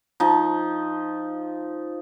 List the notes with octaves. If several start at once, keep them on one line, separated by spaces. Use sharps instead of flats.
F3 D#4